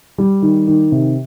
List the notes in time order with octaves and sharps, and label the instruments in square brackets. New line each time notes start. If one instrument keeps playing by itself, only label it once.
[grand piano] G3
D#3
D#3
C3